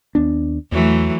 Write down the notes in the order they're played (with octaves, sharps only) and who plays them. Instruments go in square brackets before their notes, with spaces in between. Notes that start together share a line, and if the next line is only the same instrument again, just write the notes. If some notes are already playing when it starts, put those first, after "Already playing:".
[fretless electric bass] D#2 B3 D4
[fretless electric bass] E2 [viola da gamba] E3 F#3 A3